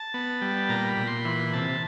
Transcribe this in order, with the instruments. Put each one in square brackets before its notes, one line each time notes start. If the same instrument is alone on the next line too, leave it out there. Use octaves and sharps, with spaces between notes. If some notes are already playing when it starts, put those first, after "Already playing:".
Already playing: [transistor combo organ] A5
B3
G3
A#2 A#5
B5
A#2
C6
E3 B5
C3 A5